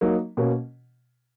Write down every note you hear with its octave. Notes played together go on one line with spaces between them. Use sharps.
F#3 A#3 D#4
B2 A#3 C#4